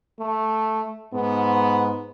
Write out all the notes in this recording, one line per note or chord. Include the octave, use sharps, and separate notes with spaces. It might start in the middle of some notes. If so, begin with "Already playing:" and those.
A3
G#2 B3